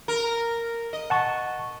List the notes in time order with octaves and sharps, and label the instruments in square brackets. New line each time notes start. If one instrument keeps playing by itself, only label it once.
[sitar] A#4
D#5
[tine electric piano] F#5 A5 C#6